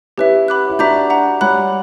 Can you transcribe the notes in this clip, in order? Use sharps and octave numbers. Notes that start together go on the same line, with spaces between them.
C#4 E4 G4 B4 E5
F#5 B5 D6 F#6
E4
D4 F#4 E5 A#5 D6 G6
F#5 A#5 D6
G3 C#5 F#5 B5 F#6